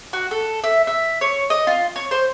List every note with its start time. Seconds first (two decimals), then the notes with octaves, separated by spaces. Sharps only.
0.13 F#4
0.31 A4
0.64 E5
0.87 E5
1.21 C#5
1.50 D#5
1.67 F4
1.96 C#5
2.11 C5